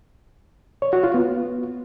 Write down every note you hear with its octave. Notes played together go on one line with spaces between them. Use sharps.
C#5
F#4
F4
B3